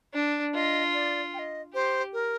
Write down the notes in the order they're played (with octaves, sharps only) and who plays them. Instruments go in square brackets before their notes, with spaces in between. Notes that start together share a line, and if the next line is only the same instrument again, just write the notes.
[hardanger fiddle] D4
[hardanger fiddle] F4 [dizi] D#5
[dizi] D5
G5
D#5
[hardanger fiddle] G4 [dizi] C5
[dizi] A#4